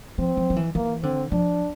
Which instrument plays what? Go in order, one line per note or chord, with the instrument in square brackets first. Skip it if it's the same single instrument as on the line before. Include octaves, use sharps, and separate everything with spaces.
[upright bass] F3 [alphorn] C4
[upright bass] F3
F3
E3
[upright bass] E3 [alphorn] A#3
[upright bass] D3 [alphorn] C4
[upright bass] F3 [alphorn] D4